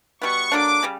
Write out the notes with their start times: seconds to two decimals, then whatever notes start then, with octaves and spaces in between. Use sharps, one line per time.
0.22 B2 G3 B3 C#6
0.52 D3 F#3 A#3 D4 D6
0.83 C#3 G3